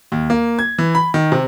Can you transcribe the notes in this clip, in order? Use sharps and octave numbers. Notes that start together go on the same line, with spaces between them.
D#2
A#3
G#6
E3
B5
D#3
C3